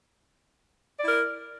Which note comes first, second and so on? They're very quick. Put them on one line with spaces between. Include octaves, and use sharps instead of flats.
D5 E4 A#4